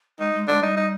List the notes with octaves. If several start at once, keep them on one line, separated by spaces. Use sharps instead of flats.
G#3 D#4
G#3
G#3 D4
G3 D#4
D#4